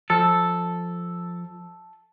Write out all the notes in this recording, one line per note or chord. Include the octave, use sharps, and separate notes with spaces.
F3 A4